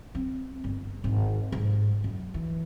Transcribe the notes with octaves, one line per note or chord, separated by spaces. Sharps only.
C4
G1
G#1
G#2
F#2
E3